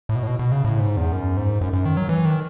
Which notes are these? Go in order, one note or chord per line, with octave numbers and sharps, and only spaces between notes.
A2
B2
A2
B2
B2
C#3
A2
G#2
E2
F#2
G#2
F#2
F#2
D#3
F#3
E3
D#3